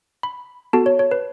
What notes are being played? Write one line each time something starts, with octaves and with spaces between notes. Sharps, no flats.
B5
B3 F#4 A4 A5
C#5
C#5
B4